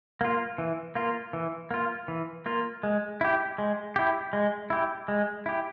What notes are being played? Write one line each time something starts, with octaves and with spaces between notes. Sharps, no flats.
A#3 F4
E3
A#3 F4
E3
A#3 F4
E3
A#3 F4
G#3
E4 G4
G#3
E4 G4
G#3
E4 G4
G#3
E4 G4